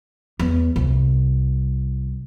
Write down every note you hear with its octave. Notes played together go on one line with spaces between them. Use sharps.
E2
C2